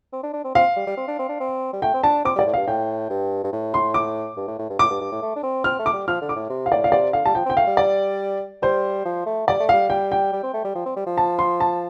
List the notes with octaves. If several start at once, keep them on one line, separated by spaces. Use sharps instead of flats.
C4
D4
D4
C4
C4 F5
G3
G3
C4
D4
C4
D4
C4
G3
A3 G5
C4
D4 A5
C4 D6
G3 D5
A2
G2 F5
A2 G5
G2
G2
A2
C6
D6
G2
A2
A2
G2
A2 D6
G2
G2
A2
A3
D4
C4
C4 F6
A3
D6
G3
F3 F6
D3
D6
A2
C3
F5
A2 D5
F5
A2
C3 D5
D3 F5
G3 A5
F3 G5
C4 G5
A3 F5
G3
D5
G3 C5
F3
A3
G3 D5
A3
G3 F5
G3 G5
G5
G3
C4
A3
G3
F3
C4
G3
F3
A5
C6
A5